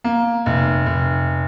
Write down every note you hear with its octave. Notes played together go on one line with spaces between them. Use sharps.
A#3
F1
F1